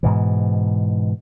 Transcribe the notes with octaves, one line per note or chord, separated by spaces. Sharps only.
G#2 B2 E3